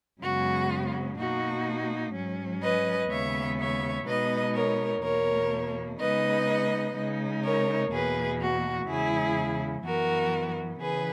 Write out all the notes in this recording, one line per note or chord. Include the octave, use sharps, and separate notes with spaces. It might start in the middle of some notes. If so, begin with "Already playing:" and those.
F#2 C#3 G#3 B3 F#4
B2 A#3 D#4 F#4
G#2 F#3 C#4
B4 D#5
D#2 C#3 G#3 B3 C#5 E5
C#5 E5
B2 G#3 B3 D#4 B4 D#5
A#4 C#5
E2 B2 A#3 A#4 C#5
C#3 G#3 B3 D#4 B4 D#5
C#3 G#3 D#4
A#4 C#5
E2 B2 A#3 G#4 B4
F#4
E2 C#3 G#3 E4 G#4
F#2 E3 B3 F#4 A#4
C#3 E3 G#4 B4